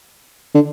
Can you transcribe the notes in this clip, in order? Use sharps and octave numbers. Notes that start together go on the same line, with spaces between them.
D3